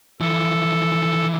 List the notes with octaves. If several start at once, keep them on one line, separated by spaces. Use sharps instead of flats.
E3 F3 A4